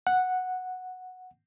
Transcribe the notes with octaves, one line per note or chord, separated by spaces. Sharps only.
F#5